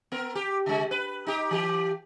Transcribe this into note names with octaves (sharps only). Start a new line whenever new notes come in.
B3 A#4
G4
C#3 G#3
B4
D#4 G4
E3 G4